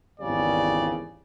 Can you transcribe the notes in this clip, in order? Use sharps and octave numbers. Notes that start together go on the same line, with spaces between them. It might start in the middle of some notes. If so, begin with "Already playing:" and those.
G#1 E2 C#3 G3 D5